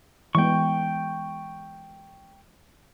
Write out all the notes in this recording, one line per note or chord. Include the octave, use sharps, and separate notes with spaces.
E3 G#3 B3 G5 C#6